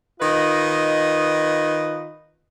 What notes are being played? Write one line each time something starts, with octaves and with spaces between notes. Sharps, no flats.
D#3 F4 B4 D#5